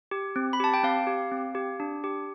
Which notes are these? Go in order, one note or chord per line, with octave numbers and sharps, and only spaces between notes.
G4
C4
B5
G4 A5
G5
C4 F5
G4
C4
G4
D4
G4